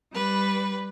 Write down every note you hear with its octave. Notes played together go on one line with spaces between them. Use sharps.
G3 B4